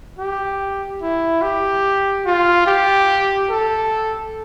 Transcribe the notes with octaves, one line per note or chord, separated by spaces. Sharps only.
G4
E4
G4
F4
G4
A4